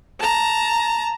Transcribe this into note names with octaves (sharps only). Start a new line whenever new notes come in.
A5 A#5